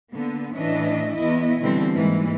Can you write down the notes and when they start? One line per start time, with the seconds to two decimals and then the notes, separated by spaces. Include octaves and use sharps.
0.11 D3 A#3 B3
0.55 A2 E3 C#4 D4 D#5 E5
1.15 E2 B3 E4 D#5
1.60 B2 D3 E3 G3 C4
1.92 G#2 E3 G3 G#3 A#3